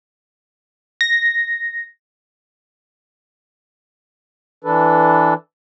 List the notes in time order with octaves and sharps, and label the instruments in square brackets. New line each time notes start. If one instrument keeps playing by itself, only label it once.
[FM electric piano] A#6
[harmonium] E3 D4 A4 B4